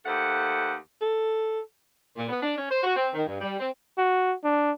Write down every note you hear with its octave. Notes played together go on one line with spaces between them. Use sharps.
D#2 A3 C5 F#5
A4
A#2
B3
D4
C#4
C5
F#4
C4
D#3
G2
G3
C4
F#4
D4